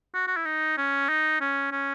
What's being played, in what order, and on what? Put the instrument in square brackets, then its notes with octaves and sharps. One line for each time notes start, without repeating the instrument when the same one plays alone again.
[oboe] F#4
F#4
E4
D#4
C#4
D#4
C#4
C#4